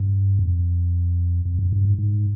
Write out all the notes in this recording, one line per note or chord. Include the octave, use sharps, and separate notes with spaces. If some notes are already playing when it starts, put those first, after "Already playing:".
Already playing: G2
F2
F2
F#2
G2
G#2
G#2